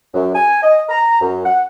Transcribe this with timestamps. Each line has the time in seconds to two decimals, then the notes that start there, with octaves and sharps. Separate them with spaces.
0.14 F#2
0.34 G#5
0.63 D#5
0.89 A#5
1.21 F#2
1.45 F#5